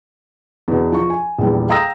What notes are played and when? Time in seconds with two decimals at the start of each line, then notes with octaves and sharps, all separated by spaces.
0.68 E2 B2
0.92 F3 C#6
1.10 G#5
1.39 A#1 E2 G3
1.69 F5 G5 A#5 D#6 E6 A#6